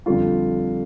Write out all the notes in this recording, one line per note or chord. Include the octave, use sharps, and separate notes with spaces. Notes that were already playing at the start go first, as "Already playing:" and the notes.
F2 D3 G3 F4